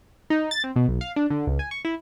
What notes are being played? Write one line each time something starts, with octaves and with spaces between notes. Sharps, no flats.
D#4
A6
C4
B2
B1
F5
D4
D3
C#2
G#5
C#6
E4